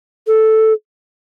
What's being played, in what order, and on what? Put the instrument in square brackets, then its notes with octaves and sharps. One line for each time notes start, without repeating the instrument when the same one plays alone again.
[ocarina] A4